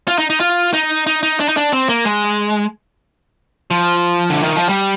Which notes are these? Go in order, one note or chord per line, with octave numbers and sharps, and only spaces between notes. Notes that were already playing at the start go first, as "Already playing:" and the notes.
F4
D#4
D#4
F4
D#4
D#4
D#4
D4
D#4
D4
C4
A#3
G#3
F3
D3
D#3
F3
G3